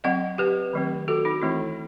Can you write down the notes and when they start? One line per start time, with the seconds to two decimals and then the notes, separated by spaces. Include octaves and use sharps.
0.04 F#3 C4 D#5 F#5
0.38 G4 B4
0.73 D#3 F#3 A3 C4
1.08 F#4 A4
1.25 D#4 F#4
1.42 E3 A3 C4 E4